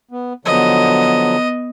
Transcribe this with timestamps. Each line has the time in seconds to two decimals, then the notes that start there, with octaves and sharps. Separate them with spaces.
0.11 B3
0.45 D3 F3 F#3 B3 D#5